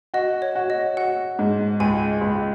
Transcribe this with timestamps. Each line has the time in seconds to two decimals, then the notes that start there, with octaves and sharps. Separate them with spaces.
0.14 F#4 D#5
0.42 C#5
0.55 F#4
0.70 D#5
0.97 F#4 F#5
1.39 G#2
1.80 C#2 G#5
2.21 C#2